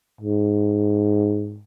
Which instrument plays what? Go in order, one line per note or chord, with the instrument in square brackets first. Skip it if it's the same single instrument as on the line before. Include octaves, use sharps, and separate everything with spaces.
[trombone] G#2